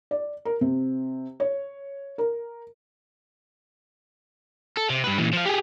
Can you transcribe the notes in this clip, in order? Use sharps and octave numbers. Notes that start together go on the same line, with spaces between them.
D5
A#4
C3
C#5
A#4
A4
C3
G2 B4
A#2 E3
F3 F5
G4 G#4